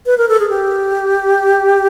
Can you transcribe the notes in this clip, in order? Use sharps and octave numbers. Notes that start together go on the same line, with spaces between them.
B4
A#4
A4
G#4
G4